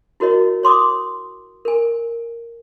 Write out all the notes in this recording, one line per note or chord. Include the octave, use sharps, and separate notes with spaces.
E4 F#4 A#4 C#5 D#5
C#5 C6 D6 D#6
A#4 G#5